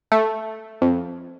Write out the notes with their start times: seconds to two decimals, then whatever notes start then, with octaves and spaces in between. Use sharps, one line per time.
0.12 A3
0.81 F2